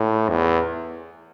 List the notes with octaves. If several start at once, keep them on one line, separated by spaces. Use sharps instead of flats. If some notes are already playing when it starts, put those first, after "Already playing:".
Already playing: A2
E2